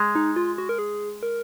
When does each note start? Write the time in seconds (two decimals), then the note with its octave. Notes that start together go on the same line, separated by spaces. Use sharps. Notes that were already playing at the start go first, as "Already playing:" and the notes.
Already playing: G#3
0.15 D#4
0.36 F4
0.58 F#4
0.69 A#4
0.78 G#4
1.23 A#4